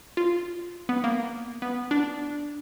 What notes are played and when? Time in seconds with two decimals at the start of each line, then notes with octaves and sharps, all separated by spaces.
0.17 F4
0.89 B3
1.04 A#3
1.62 B3
1.91 D4